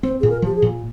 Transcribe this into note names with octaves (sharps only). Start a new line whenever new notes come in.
C4 C5
A#2 G#4
A#4
F3 G4
G#4
A#2